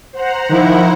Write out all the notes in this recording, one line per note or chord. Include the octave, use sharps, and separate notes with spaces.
C5 F#5 A#5
D#3 F3 E4